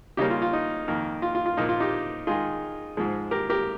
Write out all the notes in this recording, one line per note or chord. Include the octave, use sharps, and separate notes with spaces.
C#3 G3 A#3 C#4 D#4 G4
F4
F4
D#4
F2 D#3 A#3
F4
F4
F4
A#2 F3 A#3 D#4
F4
D#4 G4
D#3 G#3 D#4 F4 G#4
G#2 F3 G#3
G4 A#4
G4 A#4